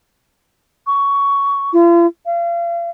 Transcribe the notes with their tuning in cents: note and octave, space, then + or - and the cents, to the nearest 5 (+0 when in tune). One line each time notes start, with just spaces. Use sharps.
C#6 +15
F4 -40
F5 -35